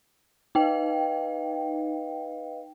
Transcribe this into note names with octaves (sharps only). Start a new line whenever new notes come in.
D#4 B4 D#5 F5 G5